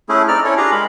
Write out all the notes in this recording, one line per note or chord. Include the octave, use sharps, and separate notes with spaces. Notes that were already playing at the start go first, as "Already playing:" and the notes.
A3 C#4 E4 G#4
C4 D#4 D5 F6
C#4 E4 A4 C#5
D4 F4 G4 G#4 F5 A#5
G#3 A#4 B5